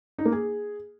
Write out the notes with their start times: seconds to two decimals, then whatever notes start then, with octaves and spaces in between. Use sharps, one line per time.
0.18 D#4
0.25 A#3
0.32 G#4